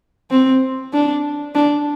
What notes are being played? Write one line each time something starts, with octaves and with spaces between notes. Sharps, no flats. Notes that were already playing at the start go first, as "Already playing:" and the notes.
C4
D4
D4